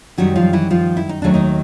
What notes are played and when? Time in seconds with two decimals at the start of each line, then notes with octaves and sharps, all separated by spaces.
0.18 F#2 D#3 F#3 G3 F#4
0.36 F3 F4
0.53 E3 E4
0.70 F3 F4
0.97 E4
1.09 D#4
1.22 D#2 D#3 F#3 A3 D4
1.34 D#3 D#4